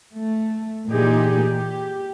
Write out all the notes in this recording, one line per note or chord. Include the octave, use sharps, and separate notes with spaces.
A3
A#2 E3 D#4 G4 G#4
G4